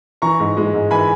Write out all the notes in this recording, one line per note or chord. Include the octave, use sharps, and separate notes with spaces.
E3 A#5 C#6
G#2
G#3
G#2
E3 G#5 B5